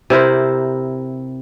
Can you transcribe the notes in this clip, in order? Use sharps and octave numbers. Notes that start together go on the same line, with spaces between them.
C3 E4 A#4 C5